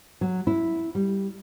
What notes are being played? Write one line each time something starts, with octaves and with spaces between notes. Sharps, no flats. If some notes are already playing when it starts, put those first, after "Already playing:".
F#3
E4
G3